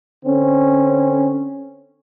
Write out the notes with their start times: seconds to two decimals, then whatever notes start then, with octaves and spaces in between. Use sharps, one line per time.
0.25 D3 C4 C#4